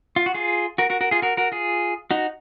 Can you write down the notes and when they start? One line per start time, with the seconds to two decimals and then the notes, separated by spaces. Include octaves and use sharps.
0.16 F4
0.26 F#4
0.34 F4 G#4
0.78 F#4 A#4
0.90 F#4 A#4
1.01 F#4 A#4
1.11 F4 G#4
1.22 F#4 A#4
1.37 F#4 A#4
1.52 F4 G#4
2.11 D#4 F#4